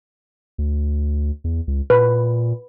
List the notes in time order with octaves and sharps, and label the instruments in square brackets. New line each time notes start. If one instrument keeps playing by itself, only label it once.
[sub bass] D2
E2
C#2
[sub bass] A#2 [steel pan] B4